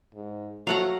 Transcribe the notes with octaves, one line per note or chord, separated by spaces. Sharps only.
G#2
F#3 A3 F#4 F5 F#5 A#5